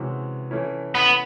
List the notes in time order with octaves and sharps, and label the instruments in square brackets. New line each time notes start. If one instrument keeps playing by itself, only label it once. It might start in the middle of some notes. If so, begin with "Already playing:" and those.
Already playing: [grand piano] C3 E3 G#3 C#4 F#4
E3 A3 C#4 E4
[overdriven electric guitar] B3